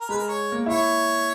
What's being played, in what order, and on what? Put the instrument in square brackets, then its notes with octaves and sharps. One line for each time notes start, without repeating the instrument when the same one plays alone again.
[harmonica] A#4
[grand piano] G#3 [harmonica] B4
[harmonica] A#4
C#5
[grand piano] A#3
[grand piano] E4 [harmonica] C#5